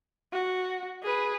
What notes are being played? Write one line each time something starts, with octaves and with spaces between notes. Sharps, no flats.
F#4
G#4 B4